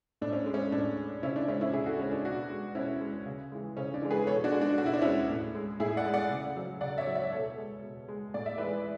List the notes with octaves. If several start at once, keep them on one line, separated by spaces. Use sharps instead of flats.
A2 D4
C#4
G#3
C#4
A2 D4
G#3
C#3 C#4 E4
D4
G#3 C#4 E4
C#4 E4
C#3 E4 G#4
F#4 A4
G#3 C#4
D4
B2 D4 F#4
G#3
B2 C#4 E4
G#3
C#3
E3 G#3
C#3 C#4
D4
E3 G#3
G#4 B4
B2 A4 C#5
D4 F#4
G#3
D4
B2 F#4
E4
D4
G#3 C#4 E4
A2
G#3
A2 E4 G#4
D5 F#5
G#3
D5 F#5
C#3
F#3
C#3 D5 F#5
C#5 E5
F#3
C#5 E5
B2 A4 C#5
G#3
B2
G#3
A2 D5
E5
E3 G#3 B4 D5